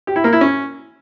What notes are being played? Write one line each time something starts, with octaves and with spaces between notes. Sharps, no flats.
G4
E4
A#3
E4
C#4